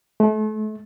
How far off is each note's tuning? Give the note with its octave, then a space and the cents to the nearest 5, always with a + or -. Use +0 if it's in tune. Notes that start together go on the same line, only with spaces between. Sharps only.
A3 -35